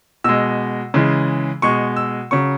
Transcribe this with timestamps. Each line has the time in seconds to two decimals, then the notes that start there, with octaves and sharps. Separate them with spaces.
0.24 B2 G#3 E6
0.94 C#3 E3 G#3
1.62 B2 G#3 C#6
1.96 E6
2.31 C#3 F#3 C#6